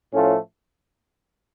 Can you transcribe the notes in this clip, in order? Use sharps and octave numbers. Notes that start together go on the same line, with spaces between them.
A2 F3 A3 C#4 F4